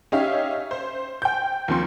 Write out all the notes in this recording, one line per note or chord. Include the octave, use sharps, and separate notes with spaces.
C#4 D#4 G4 C#5 E5 F5
C5
G5 G6
D#2 F3 C4 C6